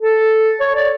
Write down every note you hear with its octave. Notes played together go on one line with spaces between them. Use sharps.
A4
C#5
D5